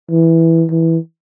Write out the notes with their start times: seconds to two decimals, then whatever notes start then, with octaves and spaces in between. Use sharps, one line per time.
0.11 E3
0.71 E3